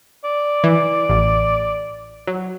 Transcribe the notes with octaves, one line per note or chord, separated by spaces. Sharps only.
D5
E3
A1
F#3